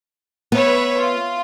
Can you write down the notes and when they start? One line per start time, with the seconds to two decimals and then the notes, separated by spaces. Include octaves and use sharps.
0.52 B3 B4 C#5 E5
0.98 F4